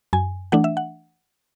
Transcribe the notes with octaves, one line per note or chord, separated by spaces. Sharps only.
F#2 G#5
E3 A3 D4 F#5
E5
F#5